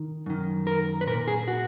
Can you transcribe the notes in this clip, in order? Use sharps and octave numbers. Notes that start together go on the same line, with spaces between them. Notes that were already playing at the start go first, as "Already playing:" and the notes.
Already playing: D#3
F#2 D#3
A#4
B4
A#2 A#4
G#4
F#4